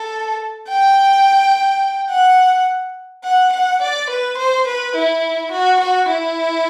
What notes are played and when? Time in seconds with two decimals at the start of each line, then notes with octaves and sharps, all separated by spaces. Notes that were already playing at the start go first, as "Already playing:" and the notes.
Already playing: A4
0.68 G5
2.10 F#5
3.24 F#5
3.53 F#5
3.82 D5
4.10 B4
4.38 C5
4.67 B4
4.95 E4
5.51 F#4
5.80 F#4
6.08 E4